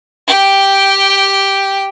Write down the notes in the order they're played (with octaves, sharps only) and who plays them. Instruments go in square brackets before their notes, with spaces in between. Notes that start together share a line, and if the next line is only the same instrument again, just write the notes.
[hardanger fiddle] G4 G5